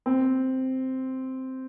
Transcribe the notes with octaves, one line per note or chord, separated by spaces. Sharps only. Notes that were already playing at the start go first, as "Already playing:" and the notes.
C4